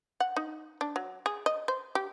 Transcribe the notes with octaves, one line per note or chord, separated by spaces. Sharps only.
F#5
D#4
D4
F#3
G#4
D#5
C5
G4